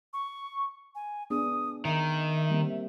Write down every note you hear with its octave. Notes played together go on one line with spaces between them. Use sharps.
C#6
G#5
B3 D4 G#4 D#6
D#3 E5
G3 A#3 C4